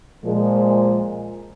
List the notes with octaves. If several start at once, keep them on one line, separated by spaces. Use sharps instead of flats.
A#2 F3 G#3